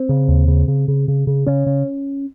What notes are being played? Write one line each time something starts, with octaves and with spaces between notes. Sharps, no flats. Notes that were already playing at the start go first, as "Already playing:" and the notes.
Already playing: C4
C#3
D#2
C#3
C#3
C#3
C#3
C#3
C#3 C#4
C#3